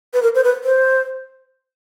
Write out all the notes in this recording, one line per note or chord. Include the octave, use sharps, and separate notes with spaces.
B4
A#4
C5
B4
C5